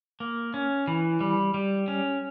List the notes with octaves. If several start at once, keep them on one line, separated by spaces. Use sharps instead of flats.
A#3
C#4
E3
G3
G3
C#4